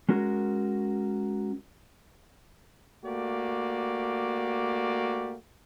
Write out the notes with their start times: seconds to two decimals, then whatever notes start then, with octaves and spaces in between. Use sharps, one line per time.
0.09 G#3 C#4 F#4 A#4
3.05 A3 A#3 F#4 G4 D5